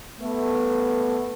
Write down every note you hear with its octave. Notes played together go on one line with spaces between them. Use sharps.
A3 B3